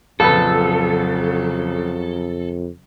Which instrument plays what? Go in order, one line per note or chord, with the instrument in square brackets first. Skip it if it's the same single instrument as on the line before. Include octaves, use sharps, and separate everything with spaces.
[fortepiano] A#1 B4 [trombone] F2 [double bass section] C#3 F#3 [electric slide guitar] A4